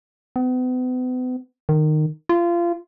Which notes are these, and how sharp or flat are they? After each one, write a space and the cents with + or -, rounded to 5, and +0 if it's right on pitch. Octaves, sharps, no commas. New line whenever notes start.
B3 +40
D#3 -20
F4 -25